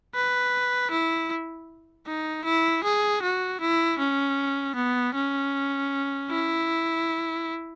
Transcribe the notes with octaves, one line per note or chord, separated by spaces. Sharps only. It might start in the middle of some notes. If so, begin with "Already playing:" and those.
B4
E4
D#4
E4
G#4
F#4
E4
C#4
B3
C#4
E4